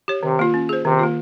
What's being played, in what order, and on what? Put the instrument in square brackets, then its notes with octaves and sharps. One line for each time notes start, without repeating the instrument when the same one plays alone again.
[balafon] G4 C#5
[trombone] C3 [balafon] D#3
[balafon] A#3 F4
C#4
G#4 C5
[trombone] C3 [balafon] D#3
[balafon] A#3 F4